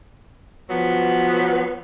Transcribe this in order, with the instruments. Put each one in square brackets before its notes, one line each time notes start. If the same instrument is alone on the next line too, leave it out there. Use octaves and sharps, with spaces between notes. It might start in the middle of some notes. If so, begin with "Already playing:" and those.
[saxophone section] F3 F#3 B3